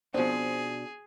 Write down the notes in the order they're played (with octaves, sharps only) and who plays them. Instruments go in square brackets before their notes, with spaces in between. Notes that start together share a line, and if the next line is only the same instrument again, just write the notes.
[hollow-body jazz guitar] B2 D4 [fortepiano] F3 C4 [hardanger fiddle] G#4